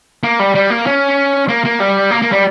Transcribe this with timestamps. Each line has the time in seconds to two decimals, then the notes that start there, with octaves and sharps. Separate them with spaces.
0.23 A#3
0.39 G3
0.55 G3
0.70 A#3
0.87 C#4
1.49 A#3
1.65 A#3
1.80 G3
2.11 A#3
2.22 A#3
2.32 G3